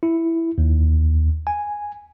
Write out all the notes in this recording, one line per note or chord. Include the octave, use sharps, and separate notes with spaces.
E4
D#2
G#5